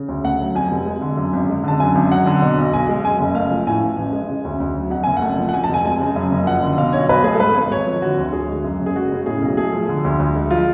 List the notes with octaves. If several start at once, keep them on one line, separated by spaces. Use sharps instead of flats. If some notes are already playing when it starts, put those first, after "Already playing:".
Already playing: C#3
D2
A3 F#5
F#3
F2 G#5
F1
G#3
D3
F#2
G#1
G#3
D3 A5
F#2 G#5
G#1
F#3 F#5
D3
B2
B1
B1 G#5
G#3
F#2 G#5
F#1
A3 F5
F3
A2 G#5
A1
A1
G#3
C#3
D2
D2
F#3
F2 F#5
F#1 G#5
F#5
A3
F3
F#5
F2 G#5
A5
F1
G#5
G#3 G#5
C#3
F#2
F#1
F3 F#5
D3
B2 F5
B1 C#5
B1 B4
A3 G#4
A4
G#2 B4
G#1
G#1 C#5
F3
D3 F#4
D2
D2 G#4
G#3
F#2
F#1
G#4
G#3 F#4
C#3
A2 G#4
B1
A3 G#4
F3
D3
D2
D2
G#3
F3 F4